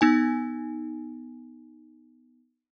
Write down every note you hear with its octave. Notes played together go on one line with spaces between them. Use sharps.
B3 D#4 G#5